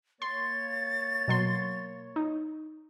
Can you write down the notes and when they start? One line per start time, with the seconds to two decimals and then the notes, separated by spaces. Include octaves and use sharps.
0.22 A#3 C#5 C6 A6
1.28 B2 F#3 C6
2.16 D#4